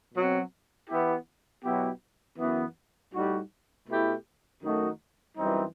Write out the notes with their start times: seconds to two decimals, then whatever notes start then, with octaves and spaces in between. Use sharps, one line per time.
0.14 B2 F#3 C4 F#4
0.89 E3 B3 E4 G4
1.64 B2 F#3 B3 E4 G4
2.38 F#2 E3 B3
3.13 A2 G3 D#4 F#4
3.88 B2 A3 E4 G4
4.62 F#2 D#3 A3 D#4 F#4
5.38 F#2 E3 G3 C4 D#4